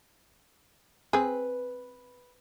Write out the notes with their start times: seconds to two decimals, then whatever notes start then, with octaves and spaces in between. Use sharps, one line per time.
1.13 C4 G#4 B4